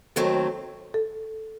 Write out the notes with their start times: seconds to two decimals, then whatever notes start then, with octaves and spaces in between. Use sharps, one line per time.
0.16 D#2 D#3 F#3 A3 C4 A4
0.94 A4